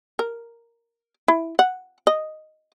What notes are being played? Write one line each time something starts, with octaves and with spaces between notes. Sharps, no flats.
A#4
E4
F#5
D#5